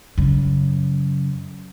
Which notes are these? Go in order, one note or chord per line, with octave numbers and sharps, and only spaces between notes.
F#2 C#3